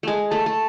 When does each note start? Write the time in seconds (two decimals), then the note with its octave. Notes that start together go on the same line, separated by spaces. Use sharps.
0.03 G#3 A3 G#5
0.31 A3 A5
0.46 A3